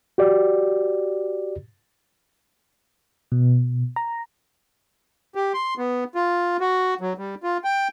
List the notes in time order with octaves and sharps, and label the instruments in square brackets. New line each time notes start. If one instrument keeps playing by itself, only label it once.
[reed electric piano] F#4 G4 D5
[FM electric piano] B2
A#5
[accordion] G4
C6
B3
F4
F#4
F#3
G3
F4
G5